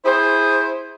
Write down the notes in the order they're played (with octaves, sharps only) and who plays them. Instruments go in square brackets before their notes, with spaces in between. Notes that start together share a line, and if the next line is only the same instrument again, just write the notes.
[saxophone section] E4 G#4 C5